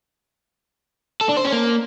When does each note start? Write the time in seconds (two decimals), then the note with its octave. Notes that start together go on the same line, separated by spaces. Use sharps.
1.21 A4
1.29 D4
1.37 C5
1.44 C#4
1.52 A#3